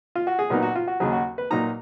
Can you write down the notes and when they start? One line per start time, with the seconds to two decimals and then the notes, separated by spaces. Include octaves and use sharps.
0.15 F4
0.27 F#4
0.39 G#4
0.50 A#2 F#3 B3 D#4 A#4
0.63 F#4
0.76 F4
0.87 F#4
1.00 D#2 C#3 F#3 G#4
1.13 F#4
1.38 B4
1.50 A#2 F#3 A#3 D#4 A#5